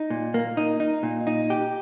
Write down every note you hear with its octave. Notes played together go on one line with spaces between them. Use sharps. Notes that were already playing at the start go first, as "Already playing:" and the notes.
Already playing: D#4
A#2
A#3
D#4
D#4
A#2
D#4
G4